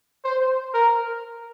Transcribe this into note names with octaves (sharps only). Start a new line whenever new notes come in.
C5
A#4